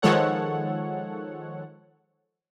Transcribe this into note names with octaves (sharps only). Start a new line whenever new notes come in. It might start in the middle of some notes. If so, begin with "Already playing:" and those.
D#3 F3 G#3 A4 C#5 F#5